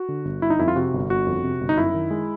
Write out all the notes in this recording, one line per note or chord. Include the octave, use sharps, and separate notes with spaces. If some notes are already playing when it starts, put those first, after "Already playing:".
Already playing: F#4
D3
G1
G1 E4
D#4
F2 E4
F4
C3 F#4
G1
G1 F#4
F2
C3
G1
D#4
F#2 E4
D#3
G#3